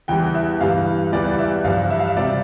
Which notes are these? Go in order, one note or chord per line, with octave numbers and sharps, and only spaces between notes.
E2 E3 G3 G5
E5
G2 E3 G3 F5
E2 E3 G3 D5
E5
G2 F3 F5
E5
F5
E5
C3 G3 D5